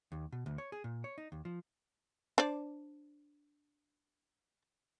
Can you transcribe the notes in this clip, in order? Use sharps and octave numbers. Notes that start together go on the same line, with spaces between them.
D#2
B2
D2
C#5
G#4
A#2
C#5
D#4
D#2
F3
D4 C5 D5